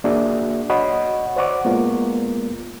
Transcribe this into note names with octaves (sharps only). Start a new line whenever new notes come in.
A#3 D4 F#4 G#4 D5 E5
F#4 C#5 D#5 F#5 B5 C#6
C5 D5 F#5 C#6 D6
G#3 A#3 B3 F4 A#4